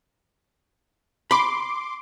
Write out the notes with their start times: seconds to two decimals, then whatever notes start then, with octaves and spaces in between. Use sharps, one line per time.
1.31 B5 C6 D6